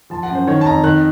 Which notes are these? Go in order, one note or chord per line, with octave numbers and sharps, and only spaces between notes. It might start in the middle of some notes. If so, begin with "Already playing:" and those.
F3 A5
F#5
F#2
C5
D#3 C#5
A5
F2 A#5
D#3 F#6